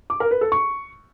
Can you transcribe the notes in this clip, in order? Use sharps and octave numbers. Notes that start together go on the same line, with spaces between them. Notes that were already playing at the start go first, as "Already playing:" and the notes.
D6
A#4
B4
A4
C#6